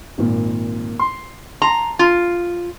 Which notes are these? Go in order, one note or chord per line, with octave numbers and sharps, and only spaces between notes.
G#1 A#2
C6
A5 A#5 C6
F4